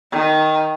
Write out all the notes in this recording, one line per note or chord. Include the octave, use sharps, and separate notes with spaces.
D#3